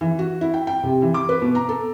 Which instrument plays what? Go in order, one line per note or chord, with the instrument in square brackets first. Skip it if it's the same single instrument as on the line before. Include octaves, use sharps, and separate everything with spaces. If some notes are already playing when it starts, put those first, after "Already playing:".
[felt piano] E3
F#4
E4
G5
G5
C3
E3
D6
B4
B2
A#5
A4